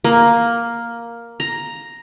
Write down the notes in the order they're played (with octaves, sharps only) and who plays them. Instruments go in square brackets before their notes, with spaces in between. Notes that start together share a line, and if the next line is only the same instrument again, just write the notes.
[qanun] A#3
A#5